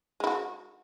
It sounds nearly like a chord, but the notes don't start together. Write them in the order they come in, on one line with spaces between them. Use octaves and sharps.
G#3 E4 F#4